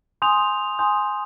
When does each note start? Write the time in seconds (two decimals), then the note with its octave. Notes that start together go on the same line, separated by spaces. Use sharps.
0.22 G#5 C6 D#6 G6 F7
0.79 G#5 C6 D#6 G6